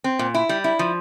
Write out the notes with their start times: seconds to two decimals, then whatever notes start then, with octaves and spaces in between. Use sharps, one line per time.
0.04 C4
0.19 A#2
0.34 E4
0.49 G3
0.64 E4
0.79 F3